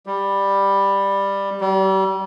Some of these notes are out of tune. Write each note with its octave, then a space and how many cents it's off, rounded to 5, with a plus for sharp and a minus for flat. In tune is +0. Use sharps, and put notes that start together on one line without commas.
G3 +10
G3 -35